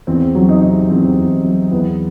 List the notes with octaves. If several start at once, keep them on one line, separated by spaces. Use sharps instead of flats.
E2 C4
F#3
D#4
C3
E2 C4
E2
F#3
E2 B3